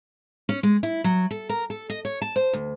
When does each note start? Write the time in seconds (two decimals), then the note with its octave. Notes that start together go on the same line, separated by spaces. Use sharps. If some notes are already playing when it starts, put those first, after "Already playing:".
0.49 C#4
0.63 G#3
0.83 E4
1.04 F#3
1.31 A4
1.49 A#4
1.70 A4
1.90 D#5
2.05 C#5
2.22 A5
2.36 C5
2.53 D2